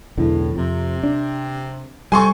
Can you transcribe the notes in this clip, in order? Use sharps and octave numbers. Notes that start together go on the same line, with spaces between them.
B1 E2 A2 D3
F2 C3
D4
C3 G3 A4 G#5 C6 C#6